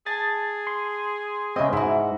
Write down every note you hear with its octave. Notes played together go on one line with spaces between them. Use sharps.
G#4 A5 A6
C6
C#3 G#3 C4 D#5 E5
G#2 E4 F#4